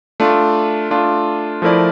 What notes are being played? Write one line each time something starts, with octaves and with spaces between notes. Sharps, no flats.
A3 D4 F4
A3 D4 F4
F3 A3 E4 A#4 D5